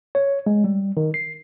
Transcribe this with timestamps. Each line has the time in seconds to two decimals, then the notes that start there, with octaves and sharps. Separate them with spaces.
0.15 C#5
0.47 G#3
0.64 G3
0.97 D#3
1.14 C7